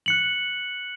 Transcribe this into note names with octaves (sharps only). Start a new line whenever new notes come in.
F#6 C#7 F#7